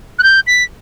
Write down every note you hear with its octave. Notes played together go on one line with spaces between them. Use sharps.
F#6
G6
B6